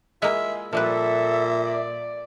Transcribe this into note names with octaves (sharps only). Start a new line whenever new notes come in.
G#3 A#3 E4 F4 G#4 E5
A#2 F3 G3 A4 B4 E5
D5